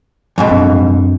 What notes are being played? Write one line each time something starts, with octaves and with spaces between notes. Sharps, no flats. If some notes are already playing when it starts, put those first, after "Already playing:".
F2 G#2 B2
F#2 C4 D4